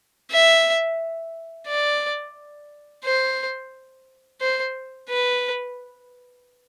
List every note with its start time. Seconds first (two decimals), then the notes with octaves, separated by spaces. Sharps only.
0.32 E5
1.67 D5
3.05 C5
4.41 C5
5.09 B4